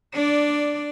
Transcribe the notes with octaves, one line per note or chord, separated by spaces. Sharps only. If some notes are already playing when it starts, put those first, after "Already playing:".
D4 D5